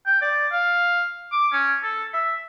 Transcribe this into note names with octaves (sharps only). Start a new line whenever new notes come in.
G5
D5
F5
D6
C#4
A4
E5